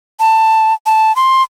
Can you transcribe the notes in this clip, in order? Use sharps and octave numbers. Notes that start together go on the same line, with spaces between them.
A5
A5
C6